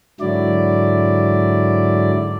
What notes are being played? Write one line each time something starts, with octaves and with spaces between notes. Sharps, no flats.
G#2 D3 F#3 E4 D5